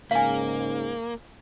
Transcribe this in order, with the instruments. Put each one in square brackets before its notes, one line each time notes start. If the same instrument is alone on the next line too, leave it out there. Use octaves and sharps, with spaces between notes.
[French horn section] G#2 C#3 [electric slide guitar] A#3 [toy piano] F5 G#5